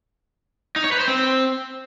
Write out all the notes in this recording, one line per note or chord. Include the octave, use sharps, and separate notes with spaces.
D#4
C#5
B4
C5
C4